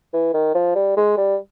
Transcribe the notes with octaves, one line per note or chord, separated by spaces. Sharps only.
E3
D#3
F3
G3
G#3
G3